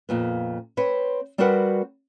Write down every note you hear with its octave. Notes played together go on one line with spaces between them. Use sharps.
F2 A#2 B3
C4 B4 C#5
G3 C4 F#4 A#4 B4 F#5